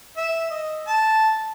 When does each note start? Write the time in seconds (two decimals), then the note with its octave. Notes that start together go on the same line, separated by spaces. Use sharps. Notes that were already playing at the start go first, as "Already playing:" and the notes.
0.17 E5
0.50 D#5
0.87 A5